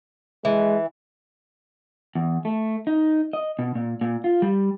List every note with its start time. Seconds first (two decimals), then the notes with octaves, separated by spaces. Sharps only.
0.45 E3 G#3
2.15 E2
2.45 A3
2.87 D#4
3.33 D#5
3.59 B2
3.75 A#2
4.01 A#2
4.24 F4
4.42 G3